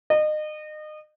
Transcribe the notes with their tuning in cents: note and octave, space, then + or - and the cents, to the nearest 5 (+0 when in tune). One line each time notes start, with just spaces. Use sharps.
D#5 -30